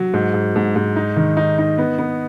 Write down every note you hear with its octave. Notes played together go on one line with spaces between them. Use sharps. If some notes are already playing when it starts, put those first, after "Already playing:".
Already playing: F#3
G#2
G#2
G#2
G#2
D#4
D#3
D#4
D#4
B3
B3